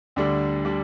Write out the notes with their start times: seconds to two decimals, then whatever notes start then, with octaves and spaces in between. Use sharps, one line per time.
0.16 D2 D3 G3 D4
0.65 D3 G3 D4